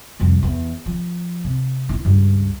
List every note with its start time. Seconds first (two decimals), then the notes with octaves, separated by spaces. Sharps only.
0.20 C2 F2
0.43 E2
0.86 F3
1.44 C3
1.89 D#4 E4
2.05 C#2 G2